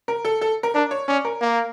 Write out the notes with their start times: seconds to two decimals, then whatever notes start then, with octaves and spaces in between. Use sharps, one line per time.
0.08 A#4
0.25 A4
0.41 A4
0.63 A#4
0.75 D4 A#4
0.91 C#5
1.08 C#4 D5
1.25 A#4
1.41 A#3